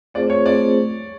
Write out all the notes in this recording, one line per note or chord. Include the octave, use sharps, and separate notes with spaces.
A3 C4 F4 G#4 C5 D5
C#5
A3 C4 F4 G#4 C5 D5